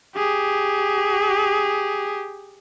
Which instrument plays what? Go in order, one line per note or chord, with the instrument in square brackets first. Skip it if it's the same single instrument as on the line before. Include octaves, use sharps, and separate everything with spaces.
[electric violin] G4 G#4